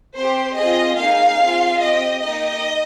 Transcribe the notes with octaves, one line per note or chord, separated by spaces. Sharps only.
C4 G4 C5
C4 F4 G#4 D#5
A#3 D#4 G#4 F5
C4 F4 G#4
C4 G4 D#5
A#3 D#4 G4 D#5